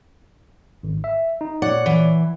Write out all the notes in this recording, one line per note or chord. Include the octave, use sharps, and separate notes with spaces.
G#1
E5
D#4
A#2 C#5 D5 F#5
E3